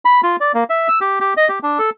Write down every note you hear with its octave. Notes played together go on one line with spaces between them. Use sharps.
B5
F4
D5
A#3
E5
E6
G4
G4
D#5
G4
D4
A4